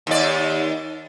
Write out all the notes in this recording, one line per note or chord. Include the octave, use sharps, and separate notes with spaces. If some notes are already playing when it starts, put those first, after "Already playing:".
D#2 D5